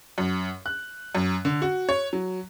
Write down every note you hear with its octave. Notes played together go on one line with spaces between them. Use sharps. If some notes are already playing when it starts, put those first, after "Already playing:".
F#2
F#6
F#2
D3
F#4
C#5
F#3